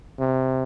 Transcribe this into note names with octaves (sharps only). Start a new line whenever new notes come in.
C3